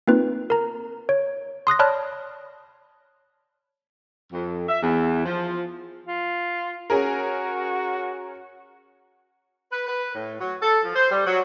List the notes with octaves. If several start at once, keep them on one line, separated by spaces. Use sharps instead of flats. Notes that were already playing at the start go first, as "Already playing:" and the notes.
A#3 C4 D#4 F4 B4
A#4 A#5
C#5
C6 D#6 F#6 A#6
C#5 D5 A5 B5 F6 F#6
F2
E5
E2
F3
F4
C#4 F#4 G#4 A#4
B4
B4
A2
F#3
A4
F3
C5
G3
F#3